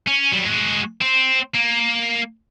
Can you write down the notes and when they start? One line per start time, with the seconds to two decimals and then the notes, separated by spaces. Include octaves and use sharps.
0.07 C#4
0.32 F#3 G3
0.45 G#3 F#4
1.01 C4
1.54 A#3